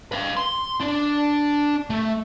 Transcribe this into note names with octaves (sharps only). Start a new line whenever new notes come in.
B4 F5
C6
D4 D5
A3